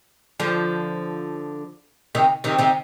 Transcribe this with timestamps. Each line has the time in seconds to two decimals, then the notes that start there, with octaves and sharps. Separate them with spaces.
0.40 D3 F3
2.15 C3 D#3
2.44 C3 D#3
2.58 C3 D#3